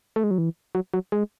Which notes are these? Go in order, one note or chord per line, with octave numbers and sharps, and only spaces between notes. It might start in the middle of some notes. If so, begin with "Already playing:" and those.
A3
G#3
F#3
E3
F#3
F#3
G#3